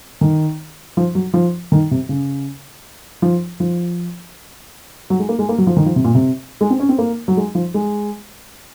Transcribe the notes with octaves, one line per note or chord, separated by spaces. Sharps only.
D#3
F3
F#3
F3
D#3
C3
C#3
F3
F3
F#3
G#3
A#3
G#3
A#3
F#3
F3
D#3
F3
C3
A#2
C3
G#3
C4
C#4
C4
A#3
F#3
G#3
F3
G#3